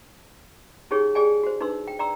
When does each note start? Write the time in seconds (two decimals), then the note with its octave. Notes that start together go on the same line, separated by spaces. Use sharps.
0.91 C#4 D#4 G4 G#4 C#5
1.15 G4 G#4 D5 G5 G#5
1.43 F#4 C5
1.61 D4 D#4 B4 C6 E6
1.87 G5
1.99 D5 G5 A#5 C6 E6